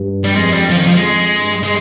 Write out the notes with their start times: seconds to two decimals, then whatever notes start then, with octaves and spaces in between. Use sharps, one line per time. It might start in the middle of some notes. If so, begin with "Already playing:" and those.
Already playing: G2
0.24 G3
0.35 F2 G#3
0.52 G3
0.70 F3
0.78 D#3
0.87 F3
0.96 G#3
1.39 G2
1.63 G#3